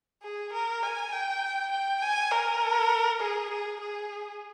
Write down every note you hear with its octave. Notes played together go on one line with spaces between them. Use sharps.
G#4
A#4
G#5
G5
G5
G#5
A#4
G#4
G#4
G#4